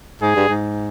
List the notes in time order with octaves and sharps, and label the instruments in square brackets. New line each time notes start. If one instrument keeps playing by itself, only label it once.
[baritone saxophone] G#2 [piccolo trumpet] G#4
[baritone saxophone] G2
G#2